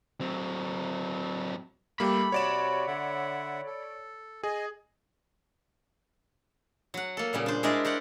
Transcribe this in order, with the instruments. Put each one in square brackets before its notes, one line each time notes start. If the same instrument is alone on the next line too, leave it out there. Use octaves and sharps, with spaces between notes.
[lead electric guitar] F#3 C4
[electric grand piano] G3 A#3 [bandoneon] A3 G4 A4 [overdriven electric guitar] B5
[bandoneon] C3 F#4 [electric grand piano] C#5 D5 E7
[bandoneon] D3 E5 F#5
A4
[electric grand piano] G#4 [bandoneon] D#5 G#5
[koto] F#3 F#5
A#3 A4
A#2 C#3 G3 B3
D4 C5
G#3 D4 E4 A#4 D5 D#5
A#4 C5 D5 F#5